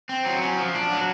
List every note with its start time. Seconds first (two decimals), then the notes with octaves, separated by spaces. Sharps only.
0.09 C4
0.25 F#3
0.42 C#4
0.58 F3
0.75 D4
0.91 F#3